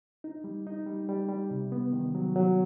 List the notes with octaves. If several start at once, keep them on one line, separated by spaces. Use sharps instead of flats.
D#4
G3
D#4
G3
G3
G3
C3
B3
D#3
F#3
F#3